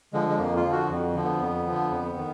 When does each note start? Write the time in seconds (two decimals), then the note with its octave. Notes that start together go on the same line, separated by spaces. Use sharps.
0.13 D3 F3 G#3
0.29 G#3
0.39 F2 A#3
0.57 F4
0.64 D3 F3
0.72 F#4
0.90 F2
1.15 D3 F3
1.24 B3
1.41 F2
1.66 D3 F3
1.91 F2
2.18 D#3